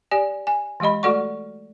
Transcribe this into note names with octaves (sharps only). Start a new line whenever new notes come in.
G4 D5 G#5
G#5
E3 G#3 G4 D#5 B5
A3 F#4 A4 D5 F#5 C#6